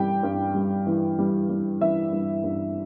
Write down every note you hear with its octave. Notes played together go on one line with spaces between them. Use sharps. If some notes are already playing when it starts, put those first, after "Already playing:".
Already playing: G2 E3 G3 G4 G5
G2
G3
E3
G3
G3
E3 E5
G2
G2